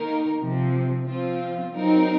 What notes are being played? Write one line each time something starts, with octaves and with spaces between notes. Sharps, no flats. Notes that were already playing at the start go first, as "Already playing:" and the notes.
Already playing: D#3 A#3 D#4 A#4
C3 F3 C4
F3 C4 F4
F#3 C4 D#4 A#4